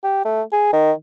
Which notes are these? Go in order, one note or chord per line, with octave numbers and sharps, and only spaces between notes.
G4
A3
G#4
D#3